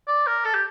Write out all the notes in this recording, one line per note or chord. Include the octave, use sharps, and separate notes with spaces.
D5
A#4
A4
G4